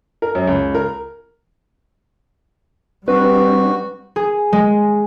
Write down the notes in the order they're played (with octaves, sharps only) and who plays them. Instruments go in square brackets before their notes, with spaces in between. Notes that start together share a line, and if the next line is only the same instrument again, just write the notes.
[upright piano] A#4
F#2
C#2
A#4
[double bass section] G3 [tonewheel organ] C4 D4 [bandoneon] F#4 [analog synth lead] B4
[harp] G#4
G#3